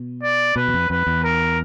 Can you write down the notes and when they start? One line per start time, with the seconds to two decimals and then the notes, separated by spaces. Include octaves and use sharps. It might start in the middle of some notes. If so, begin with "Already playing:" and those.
Already playing: B2
0.23 D5
0.56 B2 B4
0.68 E2
0.74 F2
0.90 F2 B4
1.07 E2
1.24 A#4